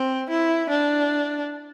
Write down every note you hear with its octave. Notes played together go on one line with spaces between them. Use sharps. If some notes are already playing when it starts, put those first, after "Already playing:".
Already playing: C4
E4
D4